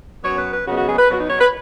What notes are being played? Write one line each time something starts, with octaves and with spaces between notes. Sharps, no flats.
F#2 F#3 B3 C#5
B4
B4
F#2 C#3 G#3 B3 F#4
F#4
G#4
B4
B2 F#3 B3 F#4
D#4
C#5
B4